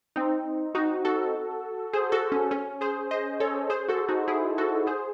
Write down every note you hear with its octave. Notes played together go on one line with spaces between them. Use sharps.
C4 D#4
D#4 F#4
F#4 A4
G#4 C5
F#4 A4
C#4
C#4
G#4 C5
C5 D#5
A4 C#5
G#4 C5
F#4 A4
D#4 F#4
E4 G#4
F#4 A4
G#4 C5